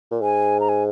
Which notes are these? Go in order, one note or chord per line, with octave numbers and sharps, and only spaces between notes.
A#2
G#2 G#5
A#5
G#5